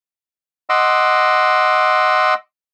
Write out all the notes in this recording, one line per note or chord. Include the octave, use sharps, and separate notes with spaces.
D#5 F#5 C6 D6 E6